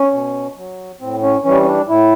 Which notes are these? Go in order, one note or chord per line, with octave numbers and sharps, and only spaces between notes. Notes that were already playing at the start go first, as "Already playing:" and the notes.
Already playing: C#4
B2
F#3
A2 C4
C#4
E3 G3 C#4
C#4
D4
A2 E4